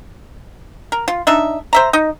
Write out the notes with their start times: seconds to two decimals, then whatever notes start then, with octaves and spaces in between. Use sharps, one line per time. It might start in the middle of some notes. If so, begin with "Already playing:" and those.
0.92 A#4
1.08 F4
1.27 D4 D#4 E5
1.73 C5 E5 A#5
1.93 D#4 D#5